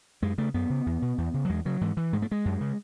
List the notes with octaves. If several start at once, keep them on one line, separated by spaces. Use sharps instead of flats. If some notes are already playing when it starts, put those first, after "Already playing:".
F#2 G#3
C#3 A3
F#2 B3
C#3
E2
B2
E2
C#3
F#3
E2 G#3
C#3 F#3
G#2 E3
E3
G#2 G#3
A3
G#3
F#2
C#3